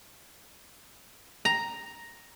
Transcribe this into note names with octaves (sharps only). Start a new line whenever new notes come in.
A#5